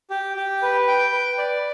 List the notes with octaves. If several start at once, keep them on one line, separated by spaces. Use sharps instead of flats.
G4
G4
B4
G5
B4
D5